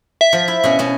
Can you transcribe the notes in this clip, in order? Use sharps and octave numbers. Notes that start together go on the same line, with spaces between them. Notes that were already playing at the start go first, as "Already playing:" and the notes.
E5
F3
E4
B2 C#4
B2 C#4